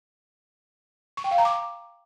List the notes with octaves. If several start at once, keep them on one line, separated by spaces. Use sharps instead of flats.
C#6
G5
F5
A#5
D6